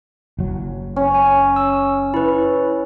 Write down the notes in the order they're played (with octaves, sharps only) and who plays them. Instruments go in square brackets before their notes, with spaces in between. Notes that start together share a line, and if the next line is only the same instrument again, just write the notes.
[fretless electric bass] F#1 F#3
[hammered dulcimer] C#4
[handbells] G#5
E6
E4 B4